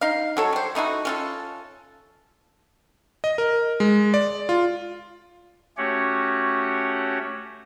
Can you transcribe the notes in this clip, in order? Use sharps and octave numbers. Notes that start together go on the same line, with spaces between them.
D#4 F5
F#3 A4 C#5
G3 C5
A3 D#4 E4 F#4
C#4 F4 A4
D#5
A#4
G#3
D5
F4
A3 C#4 F#4 G4 C#5 F#5